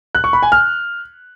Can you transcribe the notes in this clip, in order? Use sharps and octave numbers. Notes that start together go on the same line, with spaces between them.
F#6
C#6
B5
G#5
F6